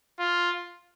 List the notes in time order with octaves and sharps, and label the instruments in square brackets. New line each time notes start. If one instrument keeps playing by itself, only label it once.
[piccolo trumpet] F4